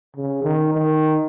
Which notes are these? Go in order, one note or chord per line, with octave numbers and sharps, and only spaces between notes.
C#3
D#3
D#3